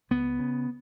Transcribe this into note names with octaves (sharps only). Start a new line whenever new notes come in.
C#2 B3
C#3